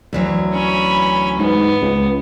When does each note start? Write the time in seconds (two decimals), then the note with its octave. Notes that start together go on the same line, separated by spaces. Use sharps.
0.13 D2 E3 F#3
0.53 C#4 B5
1.38 G#2 B3
1.81 C#2